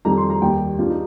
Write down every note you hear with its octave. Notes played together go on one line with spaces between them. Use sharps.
F2 D#3 G3 A#5
C6
A#5
D#2 D#3 G3 G5
G2 G3 F4
D#4